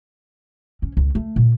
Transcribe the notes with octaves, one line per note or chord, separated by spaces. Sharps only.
C#4
C#2
A3
A#2